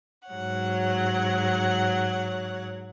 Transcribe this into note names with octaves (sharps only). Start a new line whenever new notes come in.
G#2 F#3 C#5 F#5